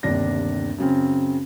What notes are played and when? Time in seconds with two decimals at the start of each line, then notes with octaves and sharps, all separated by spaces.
0.03 G1 D#2 C3 D4 A#6
0.78 F#2 C#3 C4